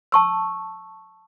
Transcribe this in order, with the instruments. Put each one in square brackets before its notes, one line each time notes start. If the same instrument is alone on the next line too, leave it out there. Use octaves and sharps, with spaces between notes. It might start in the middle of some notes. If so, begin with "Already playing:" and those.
[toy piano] A5 C#6 E6